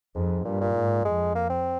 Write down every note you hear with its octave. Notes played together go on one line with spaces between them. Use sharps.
F2 G#2
G2 A#2
A#2
G#2
F2 G#3
A#3
C4